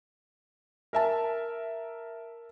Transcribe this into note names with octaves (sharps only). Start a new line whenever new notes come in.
A#4 E5 A5